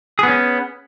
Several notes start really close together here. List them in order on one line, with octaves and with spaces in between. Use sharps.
G#4 B3 C#4